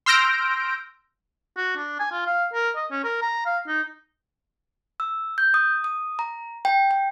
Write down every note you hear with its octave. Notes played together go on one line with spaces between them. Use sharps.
C6 E6 F6 G6 A#6 D7
F#4
D4
G#5
F4
F5
A#4
D#5
C#4
A#4
A#5
F5
D#4
E6
G6
D#6
D#6
A#5
G5
G5